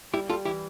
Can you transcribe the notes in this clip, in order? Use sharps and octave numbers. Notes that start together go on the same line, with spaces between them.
G3 E4 G4
G3 F4 A4
E3 E4 G4